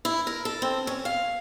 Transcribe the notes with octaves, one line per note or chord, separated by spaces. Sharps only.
E4
A#4
A4
C4
C#4
F5